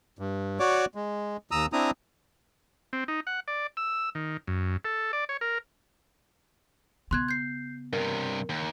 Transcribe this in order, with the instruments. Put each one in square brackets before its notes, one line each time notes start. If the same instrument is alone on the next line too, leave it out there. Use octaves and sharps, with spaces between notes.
[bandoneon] G2
F#4 C#5 D5 D6
G#3
D#2 A#5 D#6 E6
C4 D4 E4 A#5 D#6
[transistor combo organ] C4
D#4
F#5
D5
E6
D#3
F#2
A4
D5
C#5
A#4
[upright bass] C#3 B3 [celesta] C6 F#6 G#6
[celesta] G6 C7
[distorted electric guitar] G2 C3 [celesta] A#4
[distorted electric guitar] D#2